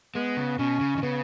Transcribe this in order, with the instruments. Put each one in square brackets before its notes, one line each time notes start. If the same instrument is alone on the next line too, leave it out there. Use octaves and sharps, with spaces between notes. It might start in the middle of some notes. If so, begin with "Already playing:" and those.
[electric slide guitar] G#3 [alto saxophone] B3
[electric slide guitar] C#3
[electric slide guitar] B2 [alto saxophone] C#4
[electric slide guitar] C#3
D#3
[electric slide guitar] C#3 [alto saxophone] B3